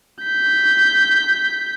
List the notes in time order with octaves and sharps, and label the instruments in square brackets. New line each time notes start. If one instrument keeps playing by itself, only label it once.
[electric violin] G6 B6